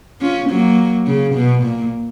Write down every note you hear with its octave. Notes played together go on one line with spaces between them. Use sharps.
C#4 F4
F#3 A#3
C#3
B2
A#2